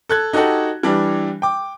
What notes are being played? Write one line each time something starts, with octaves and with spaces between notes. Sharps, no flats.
A4 F#6 G#6
D#4 F#4 G4 A4 F#5
E3 G3 D4
G5 D6